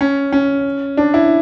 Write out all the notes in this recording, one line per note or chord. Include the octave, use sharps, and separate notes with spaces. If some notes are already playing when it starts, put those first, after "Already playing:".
C#4
C#4
D4
E4